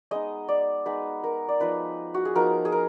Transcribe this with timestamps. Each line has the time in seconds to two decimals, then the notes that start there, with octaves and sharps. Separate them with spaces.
0.11 G#3 B3 D#4 D#5
0.48 D5
0.86 G#3 B3 D#4 B4
1.23 A#4
1.48 D5
1.60 F3 B3 D#4 B4
2.14 F#4
2.25 G#4
2.35 F3 B3 D#4 A#4
2.65 G#4
2.72 A#4